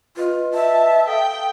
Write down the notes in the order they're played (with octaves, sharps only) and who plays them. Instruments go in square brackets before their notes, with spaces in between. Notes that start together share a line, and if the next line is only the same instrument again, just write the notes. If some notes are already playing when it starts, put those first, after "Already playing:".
[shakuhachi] F4 [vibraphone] B4 D#5
[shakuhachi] E5 [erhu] A5
[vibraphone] A4 F5 D#6 [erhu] G5